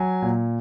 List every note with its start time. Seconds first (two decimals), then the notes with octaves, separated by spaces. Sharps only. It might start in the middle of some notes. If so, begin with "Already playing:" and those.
Already playing: F#3 G#5
0.22 A#2